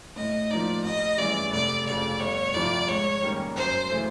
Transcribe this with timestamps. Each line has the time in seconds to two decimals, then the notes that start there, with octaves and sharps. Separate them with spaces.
0.16 A2 D#5
0.50 F3 A#3 D#4 D5
0.84 A1 D#5
1.18 G2 E3 G#3 C#4 D5
1.52 F1 D5
1.86 C#3 D5
1.91 F2
2.20 G1 C#5
2.54 F2 C3 F3 D5
2.88 G#2 C#5
3.22 D#3 G3 A#3 C#4
3.56 F#2 C5
3.90 C#3 E3 A3